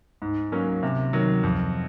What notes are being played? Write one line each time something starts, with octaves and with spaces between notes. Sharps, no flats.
G#2
F#3 A#3 C#4
C3
D#3 F#3
F2